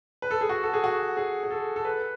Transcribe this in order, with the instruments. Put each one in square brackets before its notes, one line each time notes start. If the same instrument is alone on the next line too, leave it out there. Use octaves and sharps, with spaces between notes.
[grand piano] B4
A4
G#4
F#4
A4
G#4
F#4
G#4
G#4
A4
A4
B4